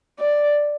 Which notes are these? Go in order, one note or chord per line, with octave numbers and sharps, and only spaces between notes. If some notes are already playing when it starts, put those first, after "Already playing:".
D5